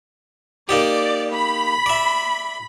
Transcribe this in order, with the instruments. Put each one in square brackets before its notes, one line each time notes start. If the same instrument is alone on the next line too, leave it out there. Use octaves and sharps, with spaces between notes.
[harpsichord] A#3 D#4 G4 [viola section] D5
[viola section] B5
[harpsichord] D5 E5